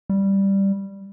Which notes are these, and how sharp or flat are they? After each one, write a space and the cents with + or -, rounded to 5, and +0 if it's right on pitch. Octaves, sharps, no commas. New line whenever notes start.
G3 +0